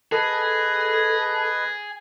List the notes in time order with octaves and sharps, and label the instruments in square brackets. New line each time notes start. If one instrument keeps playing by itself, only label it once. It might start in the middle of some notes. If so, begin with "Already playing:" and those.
[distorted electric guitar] G#4 [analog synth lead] A4 [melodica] B4 D#5